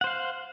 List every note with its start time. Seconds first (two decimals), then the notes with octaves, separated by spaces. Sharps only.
0.01 F#5
0.04 C5
0.07 F5